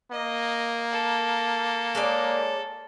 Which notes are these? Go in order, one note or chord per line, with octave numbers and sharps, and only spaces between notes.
A#3 D#5
A4
G#3 C#5 D5